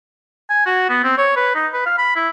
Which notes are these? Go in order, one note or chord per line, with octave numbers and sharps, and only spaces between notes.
G#5
F#4
B3
C4
C#5
B4
D#4
B4
F5
B5
E4